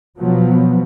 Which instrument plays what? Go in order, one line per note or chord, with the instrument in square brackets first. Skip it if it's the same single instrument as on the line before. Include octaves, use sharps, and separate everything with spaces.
[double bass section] B2 F3 F#3 B3